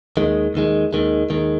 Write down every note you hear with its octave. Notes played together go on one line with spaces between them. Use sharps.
D#2 D#3 G#3
D#2 D#3 G#3
D#2 D#3 G#3
D#2 D#3 G#3